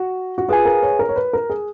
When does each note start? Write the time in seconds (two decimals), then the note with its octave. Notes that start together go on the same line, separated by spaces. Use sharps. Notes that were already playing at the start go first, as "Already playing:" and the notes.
Already playing: F#4
0.38 F#4
0.48 F4 G#4 B4 F5 G#5
0.65 A#4
0.83 C#5
0.99 A#4
1.09 C#5
1.16 B4
1.33 A#4
1.50 G#4